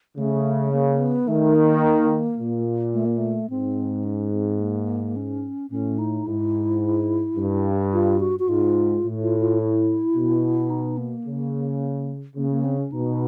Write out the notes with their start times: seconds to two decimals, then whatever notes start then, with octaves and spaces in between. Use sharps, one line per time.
0.17 C#3 A3
0.72 A#3
0.99 B3
1.28 D#3 A3
1.55 A#3
2.38 A#2
2.93 A3
3.05 A#3
3.17 A3
3.50 G#2 C4
4.04 C#4
4.32 C4
4.60 A#3
5.16 C#4
5.70 A2 C#4
5.98 D#4
6.27 G#2 E4
7.37 G2
7.93 F4
8.20 F#4
8.39 F#4
8.48 G#2 F4
9.03 A2
9.22 F4
9.40 F4
9.59 E4
10.15 B2
10.70 D#4
10.98 A#3
11.25 C#3
12.36 C#3 A#3
12.51 A#3
12.64 C4
12.78 C#4
12.91 B2 D#4